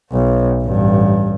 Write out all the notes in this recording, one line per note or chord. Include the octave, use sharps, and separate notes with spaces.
B1
A1 G2